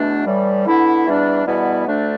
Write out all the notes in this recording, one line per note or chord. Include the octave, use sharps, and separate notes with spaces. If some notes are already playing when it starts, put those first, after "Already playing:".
Already playing: E2 B2 A3 D4
A2 E3 G3
D3 B3 E4
E2 E3 G3 D4
E2 B2 G3 B3 E4
D2 D3 A3 D4